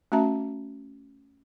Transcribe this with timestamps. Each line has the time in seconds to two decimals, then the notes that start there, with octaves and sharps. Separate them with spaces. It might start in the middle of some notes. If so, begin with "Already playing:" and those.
0.12 A3 C#4 F#4 E5 A5 A#5